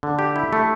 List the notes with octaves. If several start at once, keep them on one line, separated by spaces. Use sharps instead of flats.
D3
G4
E4
A3